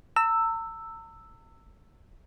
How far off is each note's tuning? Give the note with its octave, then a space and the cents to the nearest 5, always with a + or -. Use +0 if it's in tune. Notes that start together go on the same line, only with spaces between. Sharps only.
A#5 -45 E6 +0